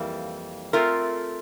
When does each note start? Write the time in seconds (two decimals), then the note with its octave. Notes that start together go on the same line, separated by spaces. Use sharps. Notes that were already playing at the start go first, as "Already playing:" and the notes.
Already playing: F2 E3 G3 A#3
0.73 A3 C4 F4 A#4